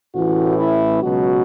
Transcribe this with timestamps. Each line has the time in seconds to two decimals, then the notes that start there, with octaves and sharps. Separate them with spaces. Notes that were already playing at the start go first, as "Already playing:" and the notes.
0.14 A1 A2 E3 F#4
0.58 E4
1.03 C#2 B2 F#3 F#4